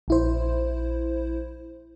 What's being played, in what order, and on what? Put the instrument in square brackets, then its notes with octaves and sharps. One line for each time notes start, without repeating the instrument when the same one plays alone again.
[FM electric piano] A#1 E4 C5